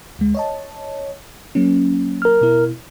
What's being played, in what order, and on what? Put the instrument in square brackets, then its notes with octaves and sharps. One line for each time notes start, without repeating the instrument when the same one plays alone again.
[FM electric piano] D2 G#3
C#5 D#5 A5
F#3 A#3 C#4
[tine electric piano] A#4 F6
[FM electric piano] B2 E4